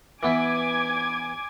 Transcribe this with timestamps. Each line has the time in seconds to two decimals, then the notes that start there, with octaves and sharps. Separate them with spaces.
0.23 E3 B3 E4 G#5 D6 G#6